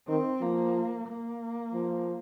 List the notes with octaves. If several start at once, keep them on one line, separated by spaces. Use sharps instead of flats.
D#3 C4
F3 A#3
A#3
F3